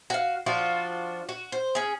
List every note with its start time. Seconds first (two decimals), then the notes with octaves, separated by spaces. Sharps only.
0.10 F#4 F5
0.46 F3 D4 F4 F#4
1.29 F#4
1.52 C5
1.75 C#4 G#4